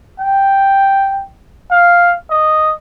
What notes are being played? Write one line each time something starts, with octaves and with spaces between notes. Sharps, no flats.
G5
F5
D#5